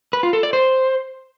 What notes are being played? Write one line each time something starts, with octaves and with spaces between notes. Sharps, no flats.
B4
F4
A4
D5
C5